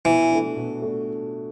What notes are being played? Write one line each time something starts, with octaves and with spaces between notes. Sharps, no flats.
B2 E3
A3 D4
B2
A3 D4